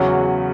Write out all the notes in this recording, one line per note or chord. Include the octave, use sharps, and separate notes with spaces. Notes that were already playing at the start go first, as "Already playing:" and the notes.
Already playing: E2 C#3 F#3 C#4 F#4